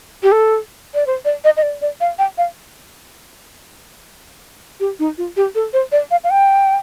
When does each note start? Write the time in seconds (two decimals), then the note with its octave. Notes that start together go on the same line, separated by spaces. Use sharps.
0.23 G4
0.32 A4
0.94 D5
1.07 C5
1.25 D5
1.44 D#5
1.57 D#5
1.63 D5
1.82 D5
2.01 F5
2.19 G5
2.38 F5
4.80 G4
4.99 D#4
5.18 F4
5.37 G4
5.55 A4
5.73 C5
5.92 D5
6.11 F5
6.24 F5
6.30 G5